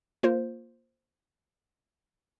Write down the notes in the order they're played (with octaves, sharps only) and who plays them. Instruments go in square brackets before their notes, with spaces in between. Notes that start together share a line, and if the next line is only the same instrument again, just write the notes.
[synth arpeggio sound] A#3 F4 C5